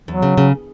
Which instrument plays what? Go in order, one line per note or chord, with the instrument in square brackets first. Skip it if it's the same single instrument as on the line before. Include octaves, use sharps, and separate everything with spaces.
[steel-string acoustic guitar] E2 [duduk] F#3
[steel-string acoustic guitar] C#3
C#3